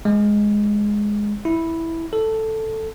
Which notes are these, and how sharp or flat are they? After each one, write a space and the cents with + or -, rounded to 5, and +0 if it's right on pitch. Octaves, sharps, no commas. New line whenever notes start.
G#3 +0
E4 -5
A4 +5